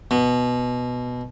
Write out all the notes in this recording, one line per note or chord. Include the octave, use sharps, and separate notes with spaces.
B2